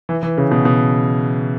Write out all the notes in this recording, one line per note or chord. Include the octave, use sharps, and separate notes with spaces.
E3
E3
C#3
B2
B2